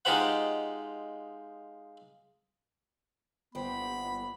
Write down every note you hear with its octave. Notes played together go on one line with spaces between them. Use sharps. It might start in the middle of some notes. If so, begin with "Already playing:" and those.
G#3 D#4 F4 G4 C5 F#5
G1 E3 A#3 B3 C5 G5 B5